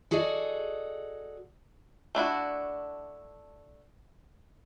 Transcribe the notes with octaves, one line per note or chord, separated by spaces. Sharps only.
F#4 G#4 A4 D5 D#5
A3 D4 E4 F#4